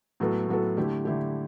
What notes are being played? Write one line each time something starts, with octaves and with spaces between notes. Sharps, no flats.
A2 F#3 B3 F#4 A4
A2 F#3 B3 F#4 A4
D3 A3 E4 G4
D3 A3 E4 G4